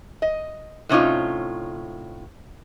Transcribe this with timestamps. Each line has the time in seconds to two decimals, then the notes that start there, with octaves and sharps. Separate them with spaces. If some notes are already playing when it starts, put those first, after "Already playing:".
0.22 D#5
0.89 A2 C3 C#4 D#4 F4